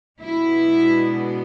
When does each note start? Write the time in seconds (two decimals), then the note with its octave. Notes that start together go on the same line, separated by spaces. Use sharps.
0.21 B2 G#3 B3 D4 E4